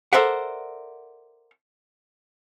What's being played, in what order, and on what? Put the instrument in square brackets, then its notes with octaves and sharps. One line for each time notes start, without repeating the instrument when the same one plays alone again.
[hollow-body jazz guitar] A4 A#4 C5 D5 E5 F#5